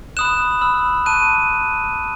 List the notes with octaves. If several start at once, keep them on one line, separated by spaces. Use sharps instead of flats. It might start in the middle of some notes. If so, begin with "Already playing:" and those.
B5 D#6 F#6 E7
B5 E6
A5 C#6 F#6 D#7